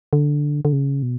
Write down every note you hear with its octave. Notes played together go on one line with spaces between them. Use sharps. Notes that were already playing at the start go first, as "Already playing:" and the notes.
D3
D3
C#3
B2